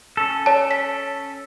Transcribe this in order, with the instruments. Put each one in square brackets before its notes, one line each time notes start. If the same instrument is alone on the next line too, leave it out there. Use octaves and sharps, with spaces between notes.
[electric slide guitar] C#4 A4
[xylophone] C#5 A5
B6